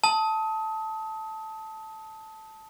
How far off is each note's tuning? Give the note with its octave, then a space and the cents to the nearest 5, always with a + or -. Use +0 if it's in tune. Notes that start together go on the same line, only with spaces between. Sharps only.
A5 +0 D#6 +30